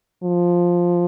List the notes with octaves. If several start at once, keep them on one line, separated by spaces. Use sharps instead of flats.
F3